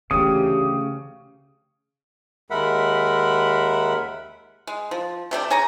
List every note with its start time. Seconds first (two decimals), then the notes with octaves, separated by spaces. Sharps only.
0.11 D2 C#3 E3 A3 G4 D#6
2.50 D#2 G#3 A#4 E5 F#5 B5
4.67 G#3
4.91 F3
5.31 C3 A3 D5 G5
5.50 G#4 C#5 G#5 A#5